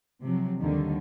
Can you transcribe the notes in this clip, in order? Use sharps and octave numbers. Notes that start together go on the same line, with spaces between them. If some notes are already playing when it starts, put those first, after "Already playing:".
C3 F3 F#3
D#2 D3 D#3 G3